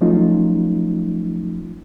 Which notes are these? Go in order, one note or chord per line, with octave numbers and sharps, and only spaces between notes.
F3 F#3 A3 C#4 D#4 F4